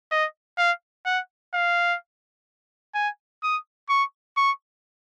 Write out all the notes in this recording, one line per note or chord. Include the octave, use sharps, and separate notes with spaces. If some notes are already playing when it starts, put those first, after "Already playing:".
D#5
F5
F#5
F5
G#5
D#6
C#6
C#6